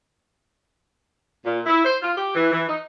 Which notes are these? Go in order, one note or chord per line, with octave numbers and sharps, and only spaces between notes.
A#2
E4
C5
F4
G4
E3
E3
D#4